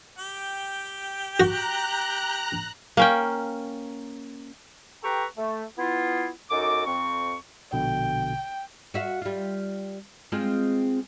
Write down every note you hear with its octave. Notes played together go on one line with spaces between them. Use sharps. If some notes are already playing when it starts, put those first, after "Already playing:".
G4 G5
F#4 A#5 F#6
A#3 C#4 G5
G4 A4 B4 G5 A#5 C#6
A3
B3 E4 F4
F#2 D#4 F#4 A4 D6
F2 C4 C#6
A#1 B2 D3 G5
F#4 E5 F5
G3 F4
G#3 C4 F4